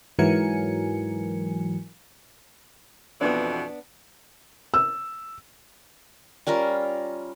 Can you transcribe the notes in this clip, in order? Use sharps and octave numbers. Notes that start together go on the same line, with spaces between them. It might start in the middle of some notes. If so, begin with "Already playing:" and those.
G#2 E3 F#3 A#4 G#5 C#7
F2 B2 E3 B3 D4
E6
G3 C#4 F4 A#4